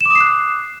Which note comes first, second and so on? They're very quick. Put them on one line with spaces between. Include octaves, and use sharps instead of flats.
E7 D6 D#6 C7 F#6